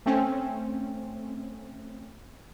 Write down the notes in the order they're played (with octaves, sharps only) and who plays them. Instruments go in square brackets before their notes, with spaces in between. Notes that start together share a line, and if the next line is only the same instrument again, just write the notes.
[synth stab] A3 C4 C#4